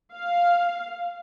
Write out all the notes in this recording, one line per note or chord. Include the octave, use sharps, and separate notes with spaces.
F5